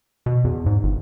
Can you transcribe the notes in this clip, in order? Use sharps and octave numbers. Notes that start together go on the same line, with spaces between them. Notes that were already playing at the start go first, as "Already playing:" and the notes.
B2
E2
G#2
G1